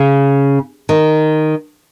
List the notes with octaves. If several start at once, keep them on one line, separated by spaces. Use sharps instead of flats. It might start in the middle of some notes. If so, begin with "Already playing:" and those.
Already playing: C#3
D#3